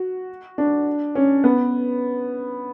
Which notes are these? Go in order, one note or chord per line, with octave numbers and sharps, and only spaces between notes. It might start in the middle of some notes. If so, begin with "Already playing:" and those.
Already playing: F#4
D4
C#4
B3